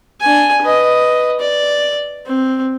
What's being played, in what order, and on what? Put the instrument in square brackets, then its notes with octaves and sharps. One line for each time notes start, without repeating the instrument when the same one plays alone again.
[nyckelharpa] D4 G#5
B4 D#5
D5
C4